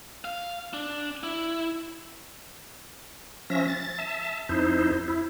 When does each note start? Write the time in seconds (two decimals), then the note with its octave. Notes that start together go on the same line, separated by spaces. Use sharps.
0.25 F5
0.73 D4
1.23 E4
3.50 F3 C#4 E5 A#6
3.68 A6
3.98 E5 A5
4.49 F2 D#4 E4 C5
5.08 E4